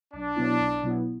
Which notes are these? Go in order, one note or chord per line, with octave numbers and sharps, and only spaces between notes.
B1 D4
B2 F#3 B3 E4
B1
B2 F#3 B3 E4